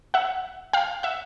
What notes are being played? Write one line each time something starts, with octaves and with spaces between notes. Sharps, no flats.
E5 F#5
F5 G5
E5 F#5